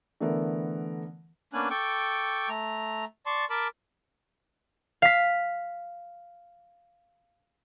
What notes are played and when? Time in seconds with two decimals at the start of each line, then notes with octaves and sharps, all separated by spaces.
0.20 D3 E3 A3 B3 A#4
1.53 A#3 B3 C#4 D4 G#5 F#6
1.70 A4 G5 C#6 D6
2.49 A3 A#5
3.26 D5 A5 C6 C#6
3.50 A#4 A5 B5 D6
5.02 F5 B6